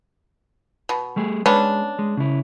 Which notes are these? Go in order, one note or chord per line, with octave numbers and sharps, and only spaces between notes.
B2
G3 A3 G#4
G#3 B3 C#4 D4
G#3
C#3 E4